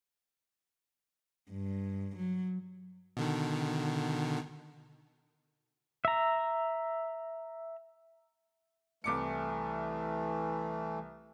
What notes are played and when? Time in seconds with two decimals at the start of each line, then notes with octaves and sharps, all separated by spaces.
1.51 G2
2.16 F#3
3.17 B2 D3 D#3
6.05 E5 A#5
9.04 C2 E3 A3 D6 C#7